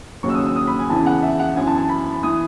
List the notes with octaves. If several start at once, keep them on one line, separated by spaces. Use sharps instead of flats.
D#2 C#3 F#3 C#6
E6
D#6
E6
D#6
B5
G#5
E2 C#3 E3 A5
F#5
E5
F#5
F#2 E3 G#5
A5
A5
B5
E3 D#6